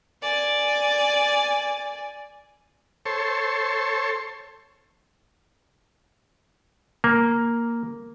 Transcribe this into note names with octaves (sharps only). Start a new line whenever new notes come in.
D5 G#5
A4 C5 C#5
A#3